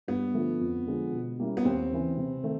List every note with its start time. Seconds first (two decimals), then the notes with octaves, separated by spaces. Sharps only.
0.08 G2 B3
0.34 D3 F3 A3
0.61 F2
0.87 D3 F3 G#3
1.12 B2
1.39 G3 A#3 C#4 E4
1.57 B3
1.65 D#2 C4
1.92 C#3 E3
2.17 C3
2.44 D#3 A3